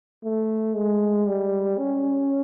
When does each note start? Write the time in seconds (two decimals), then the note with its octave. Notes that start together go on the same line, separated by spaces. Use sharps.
0.24 A3
0.76 G#3
1.27 G3
1.78 C#4